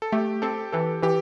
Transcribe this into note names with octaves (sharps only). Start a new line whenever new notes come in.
A4
A3 G4
C4 A4
E3 A4
E3 G4